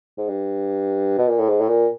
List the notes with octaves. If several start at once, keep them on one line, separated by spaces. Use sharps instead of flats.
G#2
G2
B2
A#2
A2
G#2
A2
A#2